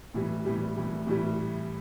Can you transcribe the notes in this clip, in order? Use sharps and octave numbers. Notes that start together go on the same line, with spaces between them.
A2 E3 G3
A2 E3 G3
A2 E3 G3
A2 E3 G3